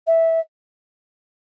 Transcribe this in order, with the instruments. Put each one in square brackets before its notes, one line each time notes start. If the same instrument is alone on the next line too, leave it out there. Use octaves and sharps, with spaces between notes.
[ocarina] E5